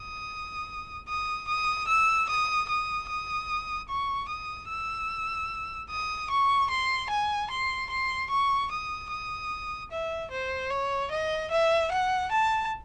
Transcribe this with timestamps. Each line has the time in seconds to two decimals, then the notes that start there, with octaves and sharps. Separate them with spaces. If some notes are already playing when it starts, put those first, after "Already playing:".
Already playing: D#6
1.09 D#6
1.48 D#6
1.88 E6
2.29 D#6
2.68 D#6
3.09 D#6
3.89 C#6
4.29 D#6
4.69 E6
5.90 D#6
6.30 C#6
6.70 C6
7.10 G#5
7.51 C6
7.90 C6
8.31 C#6
8.71 D#6
9.11 D#6
9.91 E5
10.32 C5
10.71 C#5
11.11 D#5
11.51 E5
11.92 F#5
12.32 A5